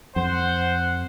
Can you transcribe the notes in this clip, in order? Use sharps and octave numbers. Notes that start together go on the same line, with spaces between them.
F2 C5 F#5